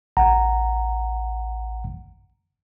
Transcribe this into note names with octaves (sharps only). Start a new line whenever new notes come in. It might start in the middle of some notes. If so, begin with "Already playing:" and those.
A1 F#5 A#5